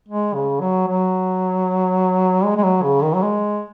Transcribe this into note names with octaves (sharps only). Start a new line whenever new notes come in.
G#3
C#3
F#3
F#3
G#3
G#3
F#3
C#3
D#3
F#3
G#3